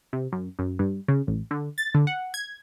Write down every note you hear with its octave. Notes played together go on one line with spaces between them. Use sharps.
C3
F#2
F#2
G2
C#3
A1
D3
A6
D3
F#5
G#6